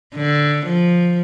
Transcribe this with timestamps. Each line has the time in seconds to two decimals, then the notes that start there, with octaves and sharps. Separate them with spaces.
0.15 D3
0.66 F3